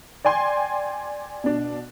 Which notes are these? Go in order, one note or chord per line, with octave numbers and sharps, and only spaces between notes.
D5 G5 G#5 C6
B2 D4